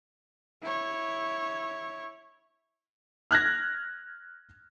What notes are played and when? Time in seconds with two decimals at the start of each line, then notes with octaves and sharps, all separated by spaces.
0.62 E4 C#5
3.31 F6 F#6 G#6 A#6